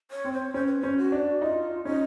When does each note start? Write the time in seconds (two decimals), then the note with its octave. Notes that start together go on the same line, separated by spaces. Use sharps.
0.11 C#5
0.25 C4
0.33 C5
0.54 C#4 C5
0.67 B4
0.80 C#4 C5
0.98 F#4
1.12 D4
1.41 D#4 F4
1.85 C#4 D#4